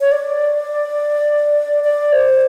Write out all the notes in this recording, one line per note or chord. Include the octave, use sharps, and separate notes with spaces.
C#5
D5
D5
C5